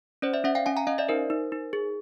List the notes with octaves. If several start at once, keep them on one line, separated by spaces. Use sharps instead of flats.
C#4 C5 D5
D5 E5
C#4 E5 F#5
F5 G5
C#4 F#5 G#5
G#5 A#5
C#4 D#5 F5
D5 E5
D#4 A#4 C5
D#4
D#4
G#4